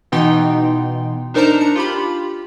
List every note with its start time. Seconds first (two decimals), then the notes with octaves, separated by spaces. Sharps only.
0.12 B2 E3 B3 D#4 G5 C6
1.34 D4 D#4 A#4 C5 A5 A#5
1.61 D4 C#7
1.76 F4 G4 B5